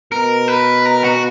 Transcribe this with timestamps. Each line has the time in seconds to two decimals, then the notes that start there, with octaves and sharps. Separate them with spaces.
0.12 B2 A#4
0.48 B4
0.86 A#4
1.04 F#4